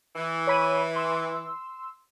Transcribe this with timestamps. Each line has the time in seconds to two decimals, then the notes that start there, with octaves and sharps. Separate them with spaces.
0.16 E3
0.47 C#5 B5 D#7
0.96 C6 E6